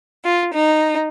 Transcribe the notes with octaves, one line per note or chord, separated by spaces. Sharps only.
F4
D#4